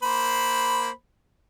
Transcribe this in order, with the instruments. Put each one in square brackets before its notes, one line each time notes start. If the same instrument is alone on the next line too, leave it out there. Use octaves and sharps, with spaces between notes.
[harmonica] A#3 C5 B5